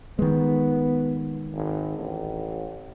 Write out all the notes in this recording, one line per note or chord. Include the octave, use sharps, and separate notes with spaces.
D#3 G#3 B3
G#1
A1